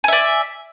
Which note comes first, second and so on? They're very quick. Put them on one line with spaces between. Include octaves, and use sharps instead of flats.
G#5 E5 D5